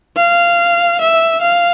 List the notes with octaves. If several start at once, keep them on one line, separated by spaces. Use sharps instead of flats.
F5
E5
F5